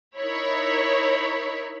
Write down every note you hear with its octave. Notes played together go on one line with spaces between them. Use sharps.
D#4 E4 A#4 C#5 B5